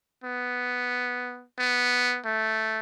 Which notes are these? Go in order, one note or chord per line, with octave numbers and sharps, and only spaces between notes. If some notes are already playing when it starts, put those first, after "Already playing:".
B3
B3
A3